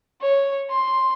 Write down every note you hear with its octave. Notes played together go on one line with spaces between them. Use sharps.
C#5
C6